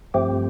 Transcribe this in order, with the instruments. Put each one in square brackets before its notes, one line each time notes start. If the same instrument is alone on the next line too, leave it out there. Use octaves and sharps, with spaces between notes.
[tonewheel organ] G2 F3 A3 C4 G4